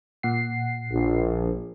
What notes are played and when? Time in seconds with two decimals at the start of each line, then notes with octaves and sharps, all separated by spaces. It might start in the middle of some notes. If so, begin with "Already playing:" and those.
0.23 A#2 F#5 C7
0.91 A#1